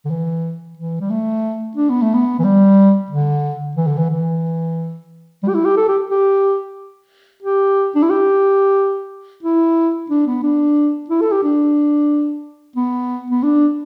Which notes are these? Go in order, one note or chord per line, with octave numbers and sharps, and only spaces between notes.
D3
E3
E3
G3
A3
D4
B3
A3
B3
E3
G3
D3
E3
D3
E3
E3
G3
G4
E4
G4
A4
G4
G4
G4
D4
E4
G4
E4
D4
B3
D4
E4
A4
G4
D4
B3
B3
D4